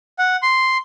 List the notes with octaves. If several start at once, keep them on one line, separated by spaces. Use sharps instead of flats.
F#5
C6